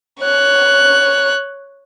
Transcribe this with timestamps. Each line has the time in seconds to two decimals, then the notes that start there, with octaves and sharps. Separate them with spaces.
0.20 C#5 F#6